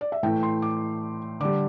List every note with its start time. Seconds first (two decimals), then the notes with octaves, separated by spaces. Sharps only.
0.01 D5
0.12 E5
0.23 A2 E3 A3 G5
0.43 C6
0.62 D6
1.40 D3 G3 D6